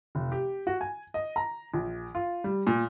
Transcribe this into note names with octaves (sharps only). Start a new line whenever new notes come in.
F1
G4
F#4
G#5
D#5
A#5
A#1
F4
G3
A#2